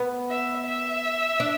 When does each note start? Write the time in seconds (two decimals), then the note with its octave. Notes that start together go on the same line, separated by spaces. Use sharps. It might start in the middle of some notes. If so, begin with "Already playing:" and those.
Already playing: B3
0.30 E5
0.67 E5
1.40 D4